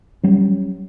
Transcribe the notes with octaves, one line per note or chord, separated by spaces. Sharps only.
F#3 G3 C#4